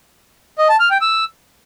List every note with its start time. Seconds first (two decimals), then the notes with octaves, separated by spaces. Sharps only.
0.58 D#5
0.69 A5
0.80 F6
0.91 G5
1.01 E6